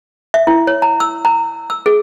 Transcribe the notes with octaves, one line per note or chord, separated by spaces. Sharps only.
E5
E4
C#5
A#5
E6
A#5
E6
G#4